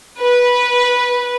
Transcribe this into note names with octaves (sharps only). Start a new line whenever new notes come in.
B4